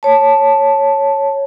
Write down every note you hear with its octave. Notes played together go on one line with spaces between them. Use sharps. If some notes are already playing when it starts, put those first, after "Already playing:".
C#5 A5